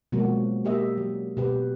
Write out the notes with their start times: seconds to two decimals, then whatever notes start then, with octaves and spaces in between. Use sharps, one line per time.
0.12 B2 F3 F#3 G#3 A#3 F#4
0.65 A#3 G4 D#5 E5
0.98 F#3
1.37 B2 G4 B4